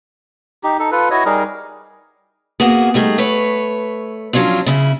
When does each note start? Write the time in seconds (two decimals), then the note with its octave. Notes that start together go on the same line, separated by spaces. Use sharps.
0.64 D#4 G4
0.80 D#4 A4
0.92 F4 A4 B4
1.11 E4 F#4 C#5 D#5
1.26 G3 D#4 G#4 A#4
2.60 A#3 B3 F#4 G#4
2.94 G3 A3 D#4 G#4
3.18 A3 B4 C#5
4.33 F3 F#3 C#4 D4 F4
4.66 C#3 E4